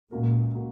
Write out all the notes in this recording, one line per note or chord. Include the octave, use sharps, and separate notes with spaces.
C#2 A#2 C#3 A#3 F#4 A#4
C#3 A#3 F#4 A#4